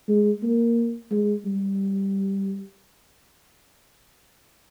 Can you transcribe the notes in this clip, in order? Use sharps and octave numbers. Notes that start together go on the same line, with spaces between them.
G#3
A#3
G#3
G3